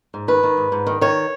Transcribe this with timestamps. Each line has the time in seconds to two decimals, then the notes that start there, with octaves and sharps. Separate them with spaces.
0.14 G#2
0.28 D#3 B4
0.43 D#3
0.57 G#2
0.72 G#2
0.87 D#3
1.01 D#3 C#5